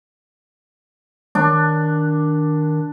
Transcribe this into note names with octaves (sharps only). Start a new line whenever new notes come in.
D#3 D4